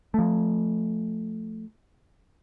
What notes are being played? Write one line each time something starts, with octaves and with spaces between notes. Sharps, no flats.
F3 A3